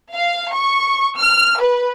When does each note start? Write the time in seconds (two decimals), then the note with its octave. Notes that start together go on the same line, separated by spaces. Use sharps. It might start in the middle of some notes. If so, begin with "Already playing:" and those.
0.15 F5
0.54 C#6
1.19 F6
1.60 B4